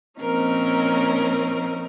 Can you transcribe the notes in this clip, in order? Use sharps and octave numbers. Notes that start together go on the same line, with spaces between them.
A#2 F3 C4 C#4 D#4 A#4